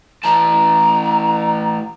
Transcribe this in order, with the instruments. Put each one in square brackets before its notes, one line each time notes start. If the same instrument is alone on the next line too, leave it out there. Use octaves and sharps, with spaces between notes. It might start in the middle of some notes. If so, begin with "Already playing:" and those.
[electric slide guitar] A2 E3 A5 [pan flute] A#5